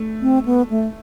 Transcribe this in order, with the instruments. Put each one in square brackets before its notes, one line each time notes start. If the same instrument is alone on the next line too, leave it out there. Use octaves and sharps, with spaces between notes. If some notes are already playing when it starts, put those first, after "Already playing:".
Already playing: [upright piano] A3
[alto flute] C4
B3
A3